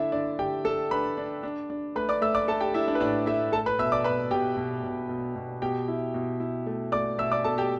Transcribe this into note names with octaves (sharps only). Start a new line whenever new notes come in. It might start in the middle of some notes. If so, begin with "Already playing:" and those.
Already playing: D3 D4 E4 A4 E5
D3 D4 D5
D3 G4 G5
D4 A4 A5
D4 B4 B5
D4
D4
D4
A3 B4 B5
D5 D6
A3 E5 E6
D5 D6
A3 A4 A5
G4 G5
D4 E4 E5
D4 D5
B4
A2 D4 D5
A3 E4 E5
A3 A4 A5
B4 B5
B2 E5 E6
D5 D6
B2 B4 B5
B2 G4 G5
B2
B2
B2
B2
B2 G4 G5
E4
B2
E4
A3
A3 D5 D6
B2 E5 E6
D5 D6
B2 A4 A5
G4 G5